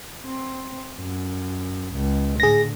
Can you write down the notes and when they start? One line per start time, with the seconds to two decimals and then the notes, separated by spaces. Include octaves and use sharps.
0.26 C4
0.99 F#2
1.94 C#2
2.40 A2 D3 G#4 A#6